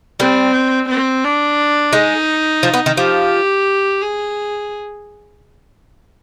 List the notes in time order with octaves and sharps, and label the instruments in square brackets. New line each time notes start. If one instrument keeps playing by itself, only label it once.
[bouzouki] G3 [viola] C4
[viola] C4
D4
[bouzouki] G#3 [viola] D#4
[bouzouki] F3
B3
D#3
[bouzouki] F3 [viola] G4
[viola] G#4